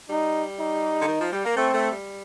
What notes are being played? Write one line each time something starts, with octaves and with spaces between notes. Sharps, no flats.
G3 D#4
D#4
D3
D#3
F3
G3
A#3
A3 C4
A3
G3